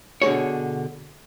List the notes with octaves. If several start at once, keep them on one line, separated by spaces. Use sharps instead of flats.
B2 D3 G#4 C#5